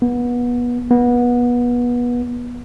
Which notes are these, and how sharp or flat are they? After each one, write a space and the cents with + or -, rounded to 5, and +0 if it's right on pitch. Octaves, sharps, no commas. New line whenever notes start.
B3 -25
B3 -25